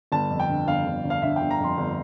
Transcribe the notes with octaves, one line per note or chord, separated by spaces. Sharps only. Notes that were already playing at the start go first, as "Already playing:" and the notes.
G1 A5
F2
G5
D3
G1 F5
G1
G1
F5
D3 E5
G5
G1
A#5
F2 C6
G1